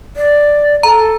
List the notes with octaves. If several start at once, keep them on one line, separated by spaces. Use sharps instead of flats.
D5
A4 A#5